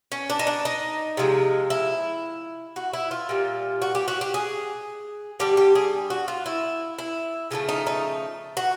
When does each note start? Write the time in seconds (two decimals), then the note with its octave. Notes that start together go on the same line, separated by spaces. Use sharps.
0.12 C#4
0.30 D4
0.39 D#4
0.47 D4
0.65 D#4
1.17 C3 F3 G#3
1.70 E4
2.76 F#4
2.93 E4
3.11 F4
3.29 A#2 G3
3.82 F#4
3.95 G4
4.08 F#4
4.21 G4
4.34 G#4
5.40 D3 G3 G4
5.57 G4
5.75 G#4
6.10 F#4
6.28 F4
6.46 E4
6.98 E4
7.51 C#3 F3 A3 D#4
7.69 D#4
7.87 D#4
8.57 F#4